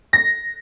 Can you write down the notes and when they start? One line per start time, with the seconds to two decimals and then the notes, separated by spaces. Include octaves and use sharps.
0.13 A#6